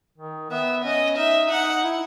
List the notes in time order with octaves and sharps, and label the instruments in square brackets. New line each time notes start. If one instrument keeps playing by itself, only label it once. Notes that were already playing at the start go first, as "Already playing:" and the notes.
[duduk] D#3
[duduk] B3 [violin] E5
[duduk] C#4 [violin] D#5
[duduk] D#4 [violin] E5
[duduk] D#4 [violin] F#5
[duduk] E4